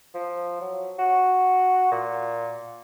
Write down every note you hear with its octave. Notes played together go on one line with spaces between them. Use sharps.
F3
F#3
F#4
A#2